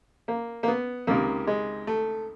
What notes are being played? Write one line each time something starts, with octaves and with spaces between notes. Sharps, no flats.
A#3
A#3
B3
C#2 C3 D#3 A#3
G#3
A3